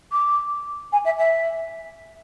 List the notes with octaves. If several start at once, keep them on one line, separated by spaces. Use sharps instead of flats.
D6
G#5
E5
E5